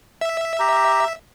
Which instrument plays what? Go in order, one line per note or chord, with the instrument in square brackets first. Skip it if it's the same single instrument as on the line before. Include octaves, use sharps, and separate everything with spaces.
[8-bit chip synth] E5
[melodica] G4 A#5